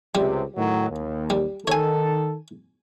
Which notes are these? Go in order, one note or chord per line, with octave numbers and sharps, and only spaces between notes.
C#2 C3 G3
A2 D#3 F#3
D#2
G3
D#3 A4 C#5 G#5